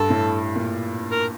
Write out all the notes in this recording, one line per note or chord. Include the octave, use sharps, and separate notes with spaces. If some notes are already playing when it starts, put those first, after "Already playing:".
Already playing: G2 A4
A2
A#2
A#4